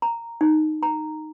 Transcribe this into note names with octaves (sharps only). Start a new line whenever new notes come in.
A#5
D#4
A#5